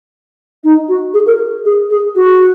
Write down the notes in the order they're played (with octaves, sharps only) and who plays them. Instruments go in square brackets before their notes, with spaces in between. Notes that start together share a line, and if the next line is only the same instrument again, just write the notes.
[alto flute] D#4
F#4
G#4
A#4
G#4
G#4
F#4